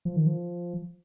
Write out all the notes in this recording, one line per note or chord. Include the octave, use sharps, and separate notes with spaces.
F3
D#3
F3